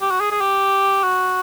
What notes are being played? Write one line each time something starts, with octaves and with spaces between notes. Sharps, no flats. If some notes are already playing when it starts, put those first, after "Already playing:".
G4
F#4
G#4
G#4
G4
F#4